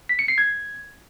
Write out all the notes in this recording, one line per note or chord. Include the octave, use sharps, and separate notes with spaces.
B6
C#7
C7
G#6